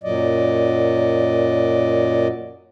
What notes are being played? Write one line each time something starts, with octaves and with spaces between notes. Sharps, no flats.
F#2 A#2 F#3 D5 D#5